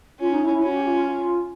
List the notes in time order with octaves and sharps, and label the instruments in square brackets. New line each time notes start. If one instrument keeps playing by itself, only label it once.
[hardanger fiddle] C#4 [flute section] F4
[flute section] D#4
E4
E4
[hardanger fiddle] C#4 [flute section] F#4
[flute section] G4
F4
F4
F4